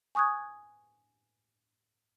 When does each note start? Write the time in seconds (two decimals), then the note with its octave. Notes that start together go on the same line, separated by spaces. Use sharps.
0.15 G#5 C#6 D#6 F#6 G#6